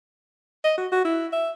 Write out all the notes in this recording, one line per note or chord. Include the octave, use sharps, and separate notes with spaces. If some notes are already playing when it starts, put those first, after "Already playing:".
D#5
F#4
F#4
E4
E5